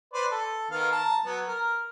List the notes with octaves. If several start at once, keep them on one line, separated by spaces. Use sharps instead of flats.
B4 C5 D5
A4
D#3 B3 F5
A5 A#5
F#3 B3
A#4